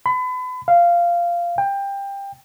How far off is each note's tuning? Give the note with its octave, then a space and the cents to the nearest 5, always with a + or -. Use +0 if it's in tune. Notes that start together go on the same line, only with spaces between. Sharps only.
B5 +35
F5 -15
G5 +20